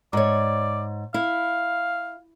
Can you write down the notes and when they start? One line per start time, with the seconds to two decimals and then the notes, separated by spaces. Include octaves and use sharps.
0.13 G#2 C#5 D5
1.14 E4 F5